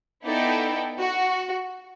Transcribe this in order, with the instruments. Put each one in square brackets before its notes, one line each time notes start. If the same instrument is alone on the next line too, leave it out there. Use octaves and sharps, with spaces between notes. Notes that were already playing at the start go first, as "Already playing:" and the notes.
[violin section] B3 E4 A4 D5 G5 [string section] D#4
[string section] F#4